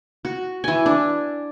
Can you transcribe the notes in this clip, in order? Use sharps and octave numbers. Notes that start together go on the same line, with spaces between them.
F#4
E3 G#5
D4